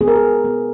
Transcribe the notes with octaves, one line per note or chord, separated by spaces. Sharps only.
B3 G#4
A#4
G#4
B3